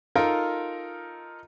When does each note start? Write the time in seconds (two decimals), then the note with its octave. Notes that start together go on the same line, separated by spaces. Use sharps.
0.15 D#4 F4 A4 A#4